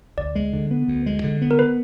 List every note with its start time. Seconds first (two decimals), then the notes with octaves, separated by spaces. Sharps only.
0.18 D2 D5
0.35 G#3
0.53 D3
0.71 B3
0.88 D2
1.06 G#3
1.24 D3
1.42 B3
1.51 A#4
1.59 B4